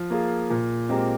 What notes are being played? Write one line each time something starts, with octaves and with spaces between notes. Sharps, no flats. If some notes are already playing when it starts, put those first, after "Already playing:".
Already playing: F3
A#3 F4 G#4
A#2
G#3 C4 G4 A#4